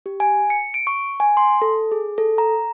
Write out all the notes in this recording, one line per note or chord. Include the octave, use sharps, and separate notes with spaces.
G4
G#5
C#7
D7
C#6
G#5
C6
A4
G#4
A4
A#5